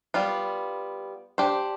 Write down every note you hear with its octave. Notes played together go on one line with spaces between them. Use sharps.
G3 B3 F4
D4 G4 C5